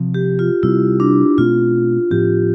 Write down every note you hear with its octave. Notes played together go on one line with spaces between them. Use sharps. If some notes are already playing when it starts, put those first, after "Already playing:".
Already playing: C3 F3 C4
G4
F4
C3 G3 C4 E4
D4
B2 A3 C4 F4
A2 F3 C4 G4